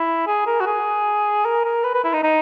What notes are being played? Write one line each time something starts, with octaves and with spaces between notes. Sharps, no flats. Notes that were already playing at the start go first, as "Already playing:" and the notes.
Already playing: E4
G#4
A#4
F#4
G#4
A#4
A#4
B4
B4
E4
D#4
D#4